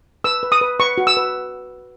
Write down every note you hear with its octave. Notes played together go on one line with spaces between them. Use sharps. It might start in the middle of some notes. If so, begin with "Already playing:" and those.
B4 E6
B4
D#6
B4
B4 C#6
F#4
E6
B4